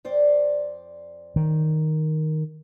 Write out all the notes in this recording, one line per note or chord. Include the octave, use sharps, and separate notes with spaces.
F2 C5 D5
D#3